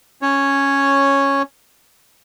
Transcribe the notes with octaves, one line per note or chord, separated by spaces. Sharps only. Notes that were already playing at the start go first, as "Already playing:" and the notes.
C#4 C#5